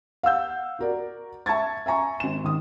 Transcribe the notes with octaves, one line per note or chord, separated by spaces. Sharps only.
F5 F#5 E6 G6
F#4 A#4 D5
E5 A5 C#6 G#6 A6
E5 G#5 A#5 C#6
G#1 E7
D#3 D#6